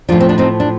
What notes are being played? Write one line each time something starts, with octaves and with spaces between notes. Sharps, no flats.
A2 F3 D4 F4
C4
D4
C4 D#4
D4